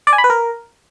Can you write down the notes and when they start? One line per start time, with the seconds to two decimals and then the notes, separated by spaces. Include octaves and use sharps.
0.07 D5
0.13 G#5
0.18 B5
0.24 B4
0.30 A#4